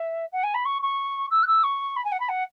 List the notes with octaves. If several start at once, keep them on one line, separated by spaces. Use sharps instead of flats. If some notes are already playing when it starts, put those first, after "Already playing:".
Already playing: E5
F#5
G#5
B5
C#6
C#6
E6
F#6
E6
C#6
B5
G#5
F#5
B5
F#5